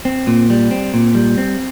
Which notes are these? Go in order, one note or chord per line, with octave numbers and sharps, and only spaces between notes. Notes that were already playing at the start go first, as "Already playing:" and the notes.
C4
A#2
G3
C4
A#2
G3
C4